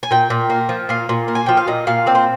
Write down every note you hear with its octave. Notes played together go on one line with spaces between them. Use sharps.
G#5
A#2 G5
A#2
A#3
F3
A#2 F5
A#2
A#3
G#5
F3 G5
F5
A#2 D#5
A#2 F5
C4 D5
C5